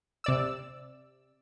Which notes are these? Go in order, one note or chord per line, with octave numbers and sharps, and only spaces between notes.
C3 D5 E6